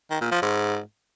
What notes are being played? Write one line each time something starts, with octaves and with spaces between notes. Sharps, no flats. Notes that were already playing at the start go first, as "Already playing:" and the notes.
D#3
A#2
F3
G#2